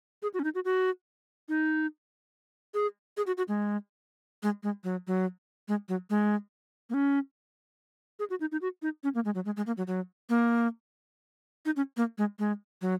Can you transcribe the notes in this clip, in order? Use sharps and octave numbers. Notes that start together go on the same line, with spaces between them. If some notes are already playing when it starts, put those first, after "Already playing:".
G#4
F#4
C#4
D#4
F#4
F#4
D#4
G#4
G#4
F#4
F#4
G#3
G#3
G#3
F#3
F#3
G#3
F#3
G#3
A#3
C#4
G#4
F#4
D#4
D#4
F#4
D#4
C#4
A#3
G#3
F#3
G#3
G#3
A#3
F#3
F#3
A#3
D#4
C#4
A#3
G#3
G#3
F#3